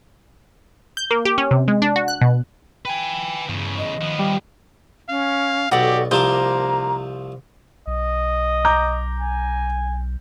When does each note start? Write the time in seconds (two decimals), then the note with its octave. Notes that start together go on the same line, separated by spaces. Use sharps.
0.97 G6
1.11 A#3
1.25 G4
1.38 C#4
1.51 C3
1.68 G#3
1.82 D4
1.96 F#4
2.08 F#6
2.21 B2
2.85 B4 G5 G#5
3.49 E2 G2 C#3
3.78 D#5
4.01 D#3 F3 B3
4.19 G3
5.09 C#4 F5
5.72 B1 F#4 G4 A4 D5
6.11 C2 F3 A#3 C5 A5 A#5 D6
7.87 B1 D#5
8.65 A#5 D6 G6
9.19 G#5